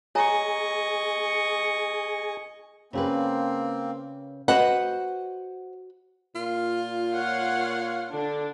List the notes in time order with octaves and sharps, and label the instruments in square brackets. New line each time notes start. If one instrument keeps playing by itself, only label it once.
[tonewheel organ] G#4 [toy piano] C#5 G#5 A#5 [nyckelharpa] D#5 C#6
[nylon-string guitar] C#3 G#4 B4 [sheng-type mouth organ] A#3 C4
[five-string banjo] F#4 B4 D#5 [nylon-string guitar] C5 F#5
[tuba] A#2 [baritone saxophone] F4
[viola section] C#5 F5 F#5
[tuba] D3 [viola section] D4